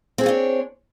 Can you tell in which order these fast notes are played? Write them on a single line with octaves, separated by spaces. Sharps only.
C4 G#4 C#5 F4 D4